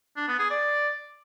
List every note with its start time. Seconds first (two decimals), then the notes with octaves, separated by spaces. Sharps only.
0.17 D4
0.28 B3
0.39 G#4
0.50 D5